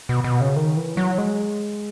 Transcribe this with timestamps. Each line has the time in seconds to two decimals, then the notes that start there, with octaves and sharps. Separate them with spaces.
0.09 B2
0.24 B2
0.41 C#3
0.56 D#3
0.77 E3
0.97 F#3
1.18 G#3